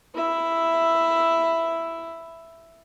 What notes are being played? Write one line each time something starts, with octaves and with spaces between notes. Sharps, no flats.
E4 E5